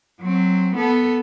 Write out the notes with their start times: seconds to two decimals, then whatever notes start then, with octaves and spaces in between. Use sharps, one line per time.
0.21 F#3 C4
0.76 B3 A4